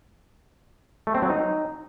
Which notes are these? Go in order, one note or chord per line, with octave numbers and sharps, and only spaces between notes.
A3
C4
F#3
D#4